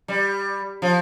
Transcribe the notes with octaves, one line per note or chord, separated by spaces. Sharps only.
G3
F3